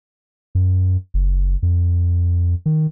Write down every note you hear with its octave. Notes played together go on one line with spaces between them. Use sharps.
F#2
F#1
F2
D#3